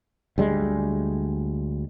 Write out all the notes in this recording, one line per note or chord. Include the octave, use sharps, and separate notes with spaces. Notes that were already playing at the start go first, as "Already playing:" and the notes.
D2 G3 G#3